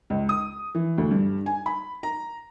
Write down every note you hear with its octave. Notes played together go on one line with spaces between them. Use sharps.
C#2
D#6
E3
D2
G2
G#5
B5
A#5